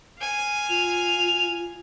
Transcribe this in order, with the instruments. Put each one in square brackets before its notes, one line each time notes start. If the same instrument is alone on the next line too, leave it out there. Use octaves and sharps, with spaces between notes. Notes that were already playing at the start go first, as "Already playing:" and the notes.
[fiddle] F5 G#5
[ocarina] F4 [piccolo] F7